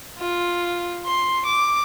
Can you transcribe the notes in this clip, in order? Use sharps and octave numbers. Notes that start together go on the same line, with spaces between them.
F4
C6
D6